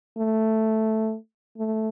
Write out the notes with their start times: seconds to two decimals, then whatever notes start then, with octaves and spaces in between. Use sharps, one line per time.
0.18 A3
1.57 A3